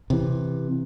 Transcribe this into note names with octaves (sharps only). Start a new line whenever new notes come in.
C3 E3